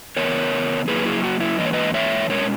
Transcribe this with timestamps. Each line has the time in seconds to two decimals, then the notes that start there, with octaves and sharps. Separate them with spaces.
0.17 C#3 E3 B3 A#4 C#5
0.88 C#3 F#3 A#3 E4 G#4 B4
1.05 E4 G#4
1.24 F#4
1.40 E4
1.59 G#2 E3 A#3 D#5
1.66 C#5
1.73 B4 D#5
1.94 C#5 E5
2.29 B2 G#3 C#4 A#4 C#5